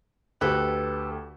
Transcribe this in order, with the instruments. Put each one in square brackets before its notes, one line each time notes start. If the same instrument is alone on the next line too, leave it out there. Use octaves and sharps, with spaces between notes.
[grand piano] D2 G4 [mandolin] A4 B4